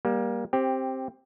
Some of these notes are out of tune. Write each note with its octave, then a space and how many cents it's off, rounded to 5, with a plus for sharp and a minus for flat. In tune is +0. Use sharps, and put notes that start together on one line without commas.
G3 +10 A#3 +25
C4 +10 G4 +0